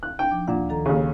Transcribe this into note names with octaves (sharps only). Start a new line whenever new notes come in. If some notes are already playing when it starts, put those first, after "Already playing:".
F#6
D4 G5
F3 D#4 D6
D2 A#2 D4 F#5
D#3 A4 A#5
D#2 C#3